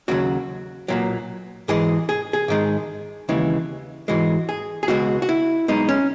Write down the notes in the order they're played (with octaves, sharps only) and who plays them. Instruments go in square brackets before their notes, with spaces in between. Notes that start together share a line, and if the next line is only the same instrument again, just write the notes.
[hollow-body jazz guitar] D#2 C#3 F#3 F#4
B1 A#2 F#3
G#2 E3 G#3 G#4
G#4
G#4
G#2 D#3 G#3
D#2 C#3 E3 G#3
G#2 E3 G#3 F#4
G#4
G#4
C#2 B2 G#3 F#4
F#4
E4
B1 B2 G#3 D#4
C#4